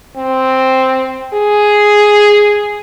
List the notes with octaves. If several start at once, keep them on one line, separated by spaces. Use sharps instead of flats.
C4
G#4